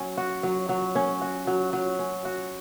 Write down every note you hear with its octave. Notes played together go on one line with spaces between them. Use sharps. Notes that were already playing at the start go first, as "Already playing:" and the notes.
Already playing: F#3 C#4
F#4
F#3
F#3
C#4
F#4
F#3
F#3
C#4
F#4